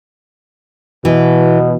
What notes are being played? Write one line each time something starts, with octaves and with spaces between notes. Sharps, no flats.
B2 E3